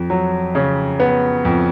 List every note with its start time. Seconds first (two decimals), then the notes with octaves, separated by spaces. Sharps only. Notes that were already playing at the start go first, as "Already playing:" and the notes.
Already playing: F2
0.10 F#3
0.55 C#3
1.00 B3
1.45 F2